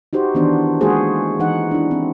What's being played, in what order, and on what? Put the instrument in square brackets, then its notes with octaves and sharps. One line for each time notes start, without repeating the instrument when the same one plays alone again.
[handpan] D#4 F#4 G4 C5
D#3 E3 B3 D4 C5
G#3 A#3 F4 F#4 G#4 C5
E3 D#4 F#5
D4 E4
C4